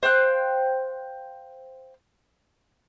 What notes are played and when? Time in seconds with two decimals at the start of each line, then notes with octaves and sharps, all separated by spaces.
0.03 C5 F5 G5 F#6